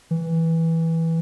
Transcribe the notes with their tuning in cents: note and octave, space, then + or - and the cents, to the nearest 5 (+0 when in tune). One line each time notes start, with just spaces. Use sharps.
E3 -10